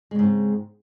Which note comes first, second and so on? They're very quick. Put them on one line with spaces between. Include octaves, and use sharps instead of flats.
G#3 C#3 G#2 C4